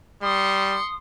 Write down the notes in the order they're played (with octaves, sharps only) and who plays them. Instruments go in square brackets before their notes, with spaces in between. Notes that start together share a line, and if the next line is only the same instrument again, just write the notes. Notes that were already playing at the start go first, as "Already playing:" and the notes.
[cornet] G3 [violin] C6 C#7 [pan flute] D#6